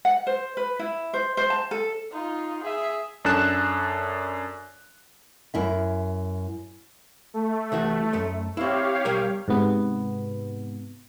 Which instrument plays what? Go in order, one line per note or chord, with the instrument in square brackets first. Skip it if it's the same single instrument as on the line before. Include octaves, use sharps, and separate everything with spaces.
[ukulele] F#5
C5
B4
E4
C5
C5
A5
A4
[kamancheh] D#4 F4
G#4 E5
[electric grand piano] F#2 D4 A4 F#6 E7
[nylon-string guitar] F#2 E4 E5
[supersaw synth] A3
[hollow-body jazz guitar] C2 E3 F#4
F#2 A3
[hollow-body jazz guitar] C4 E4 [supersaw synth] G4 C#5 F5
[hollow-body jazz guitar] B1 G3 A#4
[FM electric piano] G#2 C3 B3